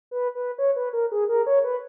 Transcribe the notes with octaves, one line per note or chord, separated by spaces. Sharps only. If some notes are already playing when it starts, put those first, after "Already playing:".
B4
B4
C#5
B4
A#4
G#4
A#4
C#5
B4